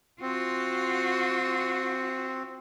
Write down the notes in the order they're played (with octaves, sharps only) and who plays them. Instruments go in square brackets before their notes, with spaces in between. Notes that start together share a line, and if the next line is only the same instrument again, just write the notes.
[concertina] C4 [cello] F4 F#4